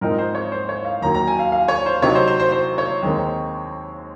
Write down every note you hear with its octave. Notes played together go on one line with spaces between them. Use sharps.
G#2 F3 C4 D#4 A#4
C5
C#5
C5
C#5
F5
D#2 D#3 F#3 A#5
A#5
G#5
F5
F5
C#5
C5
C3 F#3 C4 D#4 C#5
C5
C5
C5
C5
C#5
D#2 D#3 G#3 C4